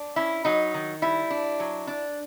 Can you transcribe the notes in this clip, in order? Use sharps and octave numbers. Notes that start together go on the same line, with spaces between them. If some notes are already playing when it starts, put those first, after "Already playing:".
Already playing: D4
C#4 E4
F#3 D#4
D#3
G3 E4
D4
F#3
D4